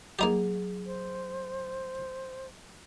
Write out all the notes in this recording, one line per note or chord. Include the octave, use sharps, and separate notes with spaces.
F#3 A#3 D#4 G4 G#4
C5